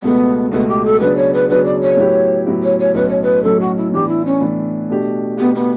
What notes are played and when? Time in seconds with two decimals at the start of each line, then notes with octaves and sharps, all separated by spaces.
0.02 C#2 B2 A3 B3
0.51 C#2 B2 A3 B3
0.68 G4
0.85 A4
1.00 C#3 F#3 B3 D4 B4
1.16 C#5
1.33 B4
1.48 C#3 F#3 B3 D4 B4
1.65 D5
1.81 C#5
1.97 A2 F#3 B3 E4 G4
2.46 A2 F#3 B3 E4 G4
2.63 C#5
2.79 C#5
2.94 B1 A2 F#3 C#4 B4
3.09 C#5
3.22 B4
3.43 B1 A2 F#3 C#4 A4
3.60 F#4
3.76 E4
3.92 A2 E3 B3 D4 G4
4.08 E4
4.25 C#4
4.41 A2 E3 B3 D4
4.89 B2 A3 D4 G4
5.38 B2 A3 B3 D4 G4
5.54 B3